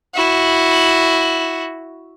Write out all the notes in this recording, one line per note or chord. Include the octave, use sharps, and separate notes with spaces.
E4 F#4